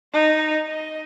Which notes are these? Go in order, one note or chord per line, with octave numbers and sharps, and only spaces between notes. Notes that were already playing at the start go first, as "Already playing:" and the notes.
D#4
D#5